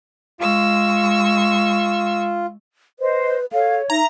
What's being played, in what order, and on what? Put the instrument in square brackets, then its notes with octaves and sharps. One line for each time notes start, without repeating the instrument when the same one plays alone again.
[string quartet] G#3 C#6 E6 [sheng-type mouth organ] F4
[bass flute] B4 [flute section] C5 D#5
[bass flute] A4 [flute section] C#5 [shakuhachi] F5
[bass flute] D#4 [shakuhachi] E5 [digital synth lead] A#5